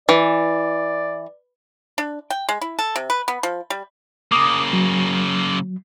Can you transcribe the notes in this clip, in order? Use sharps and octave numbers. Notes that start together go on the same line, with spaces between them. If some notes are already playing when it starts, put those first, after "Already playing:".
E3 D5
D4
G5
G#3
E4
A4
C3
B4
B3
F3
G3
C#3 A#3 D6 D#6
F#3